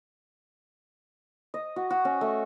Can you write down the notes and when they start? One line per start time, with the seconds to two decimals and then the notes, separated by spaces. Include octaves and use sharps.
1.54 D#5
1.76 F#4
1.90 F#4
2.05 C#4
2.21 A3